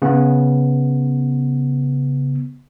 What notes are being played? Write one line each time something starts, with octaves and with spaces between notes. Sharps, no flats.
C#3 B3